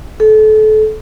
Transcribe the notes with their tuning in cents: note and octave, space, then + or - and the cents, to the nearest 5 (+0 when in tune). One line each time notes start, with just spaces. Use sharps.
A4 -30